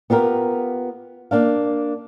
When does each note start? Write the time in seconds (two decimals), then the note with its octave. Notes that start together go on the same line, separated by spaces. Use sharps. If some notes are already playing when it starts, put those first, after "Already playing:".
0.10 B3 F4 G4 A#4
1.31 A#3 D4 F5